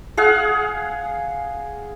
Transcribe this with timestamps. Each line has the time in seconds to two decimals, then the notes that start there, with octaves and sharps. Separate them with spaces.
0.17 G#4 F5 F#5